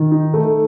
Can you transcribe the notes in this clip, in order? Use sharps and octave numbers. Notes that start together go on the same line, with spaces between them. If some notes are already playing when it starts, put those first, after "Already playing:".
Already playing: D#3
D#4
A3